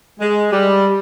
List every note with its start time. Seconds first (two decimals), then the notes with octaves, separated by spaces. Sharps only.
0.20 G#3
0.52 G3